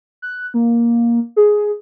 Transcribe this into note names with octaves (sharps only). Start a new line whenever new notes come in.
F#6
A#3
G#4